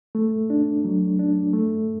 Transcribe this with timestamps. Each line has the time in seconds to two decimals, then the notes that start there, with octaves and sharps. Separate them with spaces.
0.15 A3
0.50 D4
0.85 F#3
1.19 D4
1.53 A3